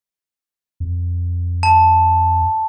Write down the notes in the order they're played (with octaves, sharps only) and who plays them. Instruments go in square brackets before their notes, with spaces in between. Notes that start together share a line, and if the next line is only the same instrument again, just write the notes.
[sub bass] F2
[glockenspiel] A5